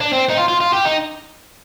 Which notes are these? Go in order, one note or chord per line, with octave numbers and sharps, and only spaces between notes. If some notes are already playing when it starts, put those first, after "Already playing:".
D4
C4
D#4
F4
F4
F4
G4
D#4